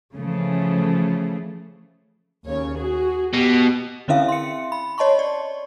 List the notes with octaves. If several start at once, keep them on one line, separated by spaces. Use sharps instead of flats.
C#3 E3 F3 A3
D#2 C#3 C#5
F#4 G#4
B2 G4
D3 C4 C#4 E4 E5 F5
C6 C#7
B5
C#5 D#5 A5 C6 C#6
D5